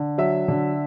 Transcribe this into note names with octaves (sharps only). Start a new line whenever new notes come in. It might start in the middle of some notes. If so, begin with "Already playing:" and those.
Already playing: D3
F#3 E5
D3